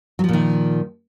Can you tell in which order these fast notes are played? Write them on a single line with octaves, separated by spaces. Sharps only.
F#3 F3 A#2 D#3